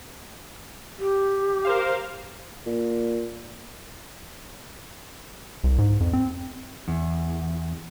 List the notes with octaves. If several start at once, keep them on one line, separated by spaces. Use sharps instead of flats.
G4
A#4 C5 F5
A#2
C2
G#2
F2
C4
E2